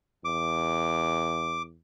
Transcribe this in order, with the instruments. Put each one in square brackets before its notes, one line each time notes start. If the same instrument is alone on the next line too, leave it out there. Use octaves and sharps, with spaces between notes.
[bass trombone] E2 [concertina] D6